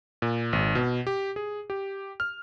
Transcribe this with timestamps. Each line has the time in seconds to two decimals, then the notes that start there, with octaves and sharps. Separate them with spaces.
0.22 A#2
0.53 G#1
0.75 B2
1.07 G4
1.36 G#4
1.70 G4
2.20 F6